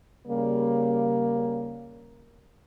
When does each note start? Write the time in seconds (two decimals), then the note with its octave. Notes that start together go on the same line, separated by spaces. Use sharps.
0.27 C#3 G3 A#3